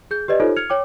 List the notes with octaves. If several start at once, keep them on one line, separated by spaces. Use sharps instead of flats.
G#4 G6
G4 B4 D5 D#5
D#4 F4 G4 A4 C5 C#5
F6 G#6 C#7 F7
C#5 G5 D6